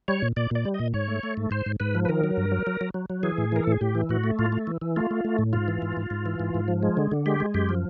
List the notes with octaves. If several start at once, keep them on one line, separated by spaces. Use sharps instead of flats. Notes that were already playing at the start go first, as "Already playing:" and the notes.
G3 C#5
A#2
A#2 D5
A#2 D5
G3
D#5
A#2
G#2 C#5
A3
A3
G#2
G#2 C5
G#2
G#2 B4
F3
B4
D#3 A#4
F#3
G2
F#3
F#3
F#3
F#3
F#3
E3 G#4
A2
E3 A#4
A4
A2 G#4
A2 G4
E3
A2 F#4
A3
A2 F4
A3
E3
E3
A3 F4
A3
A3
A2
G#2 F4
E3
G#2
G#2
G#2
E3
G#2
G#2
F3
G#3
D3
D3
G#3 G4
G#3
F#2 G4
F3